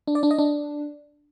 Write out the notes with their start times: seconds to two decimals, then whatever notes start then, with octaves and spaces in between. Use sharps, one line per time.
0.07 D4
0.15 D5
0.23 D4
0.31 D#5
0.38 D4